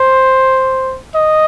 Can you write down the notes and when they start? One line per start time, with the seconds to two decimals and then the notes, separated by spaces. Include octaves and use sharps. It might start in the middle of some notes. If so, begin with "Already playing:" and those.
Already playing: C5
1.15 D#5